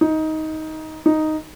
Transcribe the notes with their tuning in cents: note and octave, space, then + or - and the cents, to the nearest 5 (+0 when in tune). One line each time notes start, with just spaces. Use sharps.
D#4 +15
D#4 +0